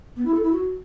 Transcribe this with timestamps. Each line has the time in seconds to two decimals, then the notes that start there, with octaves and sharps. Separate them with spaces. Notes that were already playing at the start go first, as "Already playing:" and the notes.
0.16 B3
0.25 E4
0.34 A4
0.43 E4
0.52 F#4